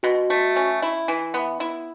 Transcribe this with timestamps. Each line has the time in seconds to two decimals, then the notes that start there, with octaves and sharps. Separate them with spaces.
0.03 B2 F#4
0.30 A3
0.56 C#4
0.82 E4
1.08 E3
1.34 B3
1.60 E4